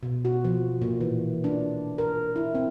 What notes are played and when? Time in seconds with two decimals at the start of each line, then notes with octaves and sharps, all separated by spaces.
0.03 B2
0.25 F#4
0.44 F3
0.82 A#2
1.01 E3
1.44 D4
1.98 A#4
2.36 E4
2.55 C4